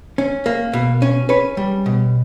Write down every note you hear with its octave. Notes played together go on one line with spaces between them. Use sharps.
C#4
A#3
B2
C#4
C#4 B4 C#5
G3
B2